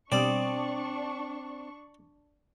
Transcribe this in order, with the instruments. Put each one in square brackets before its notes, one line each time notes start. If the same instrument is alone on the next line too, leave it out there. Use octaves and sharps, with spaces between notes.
[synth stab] B2 G3 D#6 [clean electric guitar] C4 [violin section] D4 C#6 [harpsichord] D5